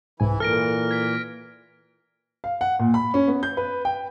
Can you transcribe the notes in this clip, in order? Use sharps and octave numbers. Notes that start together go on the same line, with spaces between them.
C2 G#2 E3 E4 G#5
A#2 E3 A4 A#4 F6 A#6 D7
G#6 B6
F5
F#5
A#2
B5
C#4
B3
G6
B4
G5